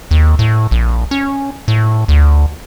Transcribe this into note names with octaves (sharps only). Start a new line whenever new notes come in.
D#2
A2
A#1
C#4
A2
D2